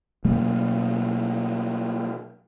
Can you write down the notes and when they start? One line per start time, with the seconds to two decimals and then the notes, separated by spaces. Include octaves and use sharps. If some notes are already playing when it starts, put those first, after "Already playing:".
0.25 B2 F#3 A3 A#3